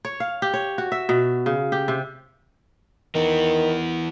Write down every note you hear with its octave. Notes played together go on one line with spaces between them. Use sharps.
C#5
F5
G4
C#5
F#4
E5
B2
C#3
G4
C3
D#3 E3 B3